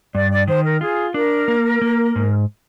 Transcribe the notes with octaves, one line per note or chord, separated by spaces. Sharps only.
G2 D5
D5
D#3 C5
A#4
F4 G#4
D4 A#4
A#3
A#3
G#2